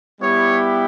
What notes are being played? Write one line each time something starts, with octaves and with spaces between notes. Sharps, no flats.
G3 B3 E4 G4 C#5